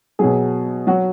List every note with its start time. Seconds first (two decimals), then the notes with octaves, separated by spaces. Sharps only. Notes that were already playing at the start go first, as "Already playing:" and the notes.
0.19 B2 F#3 G#4
0.87 F#3 F#4